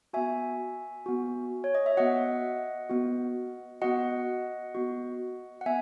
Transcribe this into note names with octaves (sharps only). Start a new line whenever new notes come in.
B3 F#4 E5 G#5
B3 F#4
C#5
D#5
E5
B3 F#4 D#5 F#5
B3 F#4
B3 F#4 D#5 F#5
B3 F#4
F#5
B3 E5 G#5